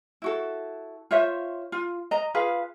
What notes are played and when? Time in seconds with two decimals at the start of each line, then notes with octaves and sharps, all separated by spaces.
0.22 E4 F#4 A4
1.11 F4 C5 C#5 E5
1.72 F4
2.11 D#5 A#5
2.34 F4 G#4 B4 F5